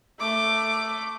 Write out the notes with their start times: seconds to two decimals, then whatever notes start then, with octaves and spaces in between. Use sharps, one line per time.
0.20 A3 D6